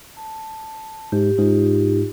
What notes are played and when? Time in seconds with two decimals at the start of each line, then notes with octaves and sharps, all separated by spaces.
0.17 A5
1.12 G#2 G4
1.38 G#2 D#4 F4 G4